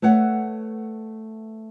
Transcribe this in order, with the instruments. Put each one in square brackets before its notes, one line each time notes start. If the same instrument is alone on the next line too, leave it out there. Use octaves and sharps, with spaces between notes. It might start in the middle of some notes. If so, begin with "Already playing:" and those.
[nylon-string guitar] A3 B4 C#5 F#5